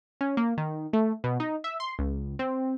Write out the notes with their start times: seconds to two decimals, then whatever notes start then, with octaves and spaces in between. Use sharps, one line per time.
0.21 C#4
0.37 A#3
0.58 D#3
0.93 A3
1.24 B2
1.40 D#4
1.64 E5
1.80 C6
1.99 C#2
2.39 C4